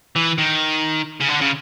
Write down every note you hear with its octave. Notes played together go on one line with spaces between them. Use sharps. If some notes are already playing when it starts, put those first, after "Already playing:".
E3
D#3
C#3
D3
C#3